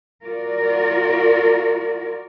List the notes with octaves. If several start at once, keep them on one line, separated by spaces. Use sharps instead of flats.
F4 F#4 A#4 D5